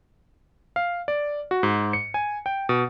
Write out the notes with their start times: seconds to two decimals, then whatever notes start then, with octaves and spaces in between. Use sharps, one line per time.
0.76 F5
1.08 D5
1.51 F#4
1.63 G#2
1.93 C#7
2.14 G#5
2.46 G5
2.69 B2